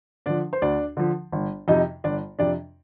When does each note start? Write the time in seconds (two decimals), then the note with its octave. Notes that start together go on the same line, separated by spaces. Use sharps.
0.26 D3 F3 D4 D5
0.53 C5
0.62 D2 D4 D5
0.97 D3 F3
1.32 G1
1.68 F2 C3 D#4 D#5
2.04 G1 D4 D5
2.39 F2 C3 D4 D5